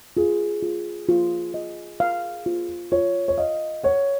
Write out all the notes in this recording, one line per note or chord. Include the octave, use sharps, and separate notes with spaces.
F4 G#4
F4
F4
D#5
F5
F4
F4 C#5
C#5
D#5 F5
C#5 F#5